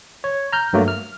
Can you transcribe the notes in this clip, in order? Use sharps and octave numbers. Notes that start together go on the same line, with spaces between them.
C#5
A#5 F6 G6
G2 F#3 A3 A#3
F6